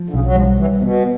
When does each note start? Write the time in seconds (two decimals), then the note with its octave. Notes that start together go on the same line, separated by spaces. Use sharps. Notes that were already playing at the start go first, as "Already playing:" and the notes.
Already playing: F3
0.10 D3
0.13 B1 C#3
0.25 F#3
0.36 F3 G3
0.59 E3 G3
0.77 C3
0.82 B2 B3